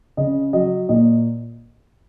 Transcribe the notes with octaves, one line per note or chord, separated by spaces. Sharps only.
C#3 D#5
F#3 D#5
A#2 D#5